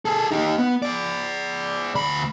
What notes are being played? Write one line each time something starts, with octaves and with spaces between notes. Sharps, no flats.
G#4 A4
D#4 G4
B3
G#4 D5
D2 B5